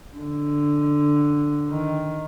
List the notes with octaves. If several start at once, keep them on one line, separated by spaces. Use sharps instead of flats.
D3
D#3